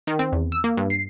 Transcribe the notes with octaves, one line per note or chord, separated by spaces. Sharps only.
D#3
C4
E2
E6
A#3
G2
C7